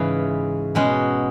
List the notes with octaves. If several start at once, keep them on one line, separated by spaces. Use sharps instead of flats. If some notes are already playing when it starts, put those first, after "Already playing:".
Already playing: G#2 C#3 E3 G#3 C#4
B2 G#3 C#4 F#4